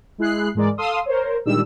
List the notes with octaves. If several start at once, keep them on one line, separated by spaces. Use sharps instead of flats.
G#3 E4 G#4 F#6 C7
G#2 E3 G#3 A#4 D5
A4 F5 C6 D#6 E6
A#4 C5 C#5
A#2 D#3 G3 G#3 D4 E6